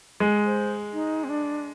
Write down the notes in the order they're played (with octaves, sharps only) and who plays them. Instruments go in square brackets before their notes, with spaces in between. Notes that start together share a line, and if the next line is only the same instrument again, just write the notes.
[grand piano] G#3
[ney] C5
D#4
C4
D4